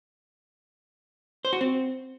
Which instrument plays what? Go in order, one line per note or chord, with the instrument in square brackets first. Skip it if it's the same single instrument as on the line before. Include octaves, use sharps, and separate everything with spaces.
[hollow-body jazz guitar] C5
F#4
C4